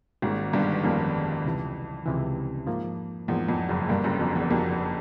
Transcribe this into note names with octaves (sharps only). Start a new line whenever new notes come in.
G#1 G#2 D#3 G3 A#3 C#4
G1 G2
F2 D#3 G3 A#3 C#4
C#2 C3 E3
C#2 C3 E3
G#2 F3 A#3
E2 G#2 F3 A#3
F2
F#1 F#2
G1 G2 G3 A#3 D4 G4 A#4
F#1 F#2
F2
E2
F2 G3 A#3 D4 G4 A#4